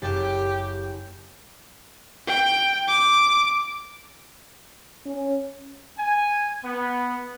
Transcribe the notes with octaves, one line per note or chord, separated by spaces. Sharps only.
F#1 G4 A6 E7
G5
D6
C#4
G#5
B3